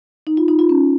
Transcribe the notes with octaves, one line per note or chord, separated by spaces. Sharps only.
D#4
F4
D#4
F4
C#4